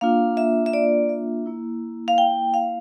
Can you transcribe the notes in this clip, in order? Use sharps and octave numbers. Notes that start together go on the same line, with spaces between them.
A#3 D4 F4 F5
E5
E5
D5
E5
A#3 E4
F5
G5
F5